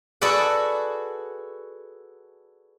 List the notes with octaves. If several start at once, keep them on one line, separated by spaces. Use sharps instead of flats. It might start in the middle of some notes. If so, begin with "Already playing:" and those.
F#4 G#4 A4 B4 D5 F#5